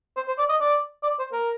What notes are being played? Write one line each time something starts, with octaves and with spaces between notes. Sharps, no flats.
C5
C5
D5
D#5
D5
D5
C5
A#4